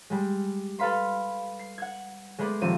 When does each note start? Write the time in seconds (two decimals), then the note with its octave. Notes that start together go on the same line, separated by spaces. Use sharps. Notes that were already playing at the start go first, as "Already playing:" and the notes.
0.10 G3 G#3
0.79 A4 B4 F5 B5 C6
1.59 C7
1.78 F#5 G#6
2.39 G#3 A3 B3 G#4 D5
2.61 D#1 F3 C4 D#7